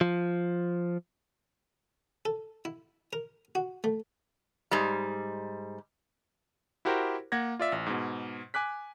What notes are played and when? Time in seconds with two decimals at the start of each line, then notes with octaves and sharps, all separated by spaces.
0.01 F3
2.25 A4
2.65 E4
3.13 A#4
3.55 F#4
3.84 A3
4.71 G#2 G3
6.85 E4 F#4 G4 A#4 C5
7.32 A#3 F#5 G#6 A#6
7.59 F4 D5 E5
7.72 A1
7.86 G#2 B2
8.54 G#5 D6 F#6 B6